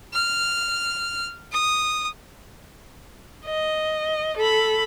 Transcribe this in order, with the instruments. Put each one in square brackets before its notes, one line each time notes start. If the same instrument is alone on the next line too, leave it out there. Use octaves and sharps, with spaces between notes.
[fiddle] F6
D#6
[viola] D#5
A4 B5